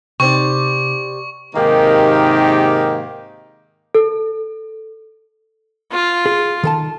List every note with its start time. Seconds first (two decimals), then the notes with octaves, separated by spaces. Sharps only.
0.20 C3 D#4 G4 C5 D5 C#6
1.56 G#2 C3 D#3 A#3 D#4 G4
3.95 A4
5.92 F4
6.26 G#4
6.64 D#3 A4 A5